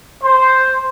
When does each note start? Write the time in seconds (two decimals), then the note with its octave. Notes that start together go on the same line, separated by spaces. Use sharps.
0.23 C5